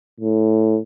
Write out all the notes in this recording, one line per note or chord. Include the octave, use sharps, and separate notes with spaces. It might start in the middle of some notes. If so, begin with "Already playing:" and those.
A2